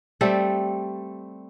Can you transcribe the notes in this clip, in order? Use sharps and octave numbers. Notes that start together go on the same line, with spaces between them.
G3 A3 C4 A4